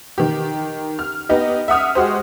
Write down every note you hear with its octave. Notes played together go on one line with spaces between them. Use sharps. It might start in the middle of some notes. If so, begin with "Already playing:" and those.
D#3 G4
F6
B3 D#4 G4 D#5
E5 F#5 D#6 F6
G#3 F#4 G4 C5